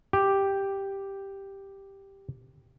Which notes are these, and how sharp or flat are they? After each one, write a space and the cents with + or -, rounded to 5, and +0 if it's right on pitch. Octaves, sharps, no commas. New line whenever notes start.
G4 +0